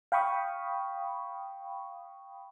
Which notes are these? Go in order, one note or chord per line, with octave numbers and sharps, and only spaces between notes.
F5 G5 B5 C#6 D#6